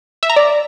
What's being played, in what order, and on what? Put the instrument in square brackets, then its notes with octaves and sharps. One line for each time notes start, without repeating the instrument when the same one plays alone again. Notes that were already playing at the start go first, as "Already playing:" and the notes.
[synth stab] E5
A#5
D5